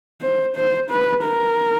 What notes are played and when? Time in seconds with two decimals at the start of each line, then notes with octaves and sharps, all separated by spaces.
0.22 C5
0.56 C5
0.90 B4
1.24 A#4